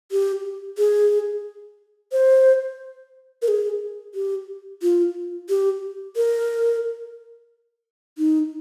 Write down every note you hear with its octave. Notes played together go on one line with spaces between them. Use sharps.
G4
G#4
C5
A#4
G#4
G4
F4
G4
A#4
D#4